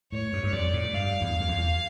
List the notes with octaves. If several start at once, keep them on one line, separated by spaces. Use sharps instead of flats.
A2 C#5
G2
G2
F2 D5
A2
G2 F5
E2
F2
E2